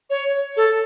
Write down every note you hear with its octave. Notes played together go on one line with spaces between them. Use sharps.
C#5
A4